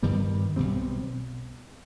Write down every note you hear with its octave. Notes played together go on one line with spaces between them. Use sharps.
G2 D#3 G3 B3
B1 B2 G3 C4